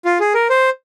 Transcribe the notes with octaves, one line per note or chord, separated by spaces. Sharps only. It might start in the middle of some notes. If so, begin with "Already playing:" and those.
F4
G#4
A#4
C5